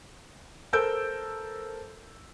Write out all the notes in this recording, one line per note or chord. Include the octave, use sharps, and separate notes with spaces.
A4 A#4 C5 E6 G6 D7